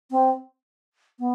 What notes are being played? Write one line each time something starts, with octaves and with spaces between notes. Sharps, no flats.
C4
B3